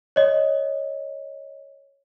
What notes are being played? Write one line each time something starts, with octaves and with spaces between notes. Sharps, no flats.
C#5 D#5